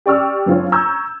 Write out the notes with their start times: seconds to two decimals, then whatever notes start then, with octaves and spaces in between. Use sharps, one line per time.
0.06 G4 D5 C#6 E6 F6
0.46 F#1 C4 D4 F4 C5 C#5
0.72 A#5 C#6 E6 G6 G#6